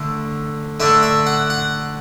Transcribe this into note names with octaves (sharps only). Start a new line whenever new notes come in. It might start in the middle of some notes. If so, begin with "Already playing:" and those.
Already playing: D3 A3
D3 A3 D4 E5
E5
F#5
F#5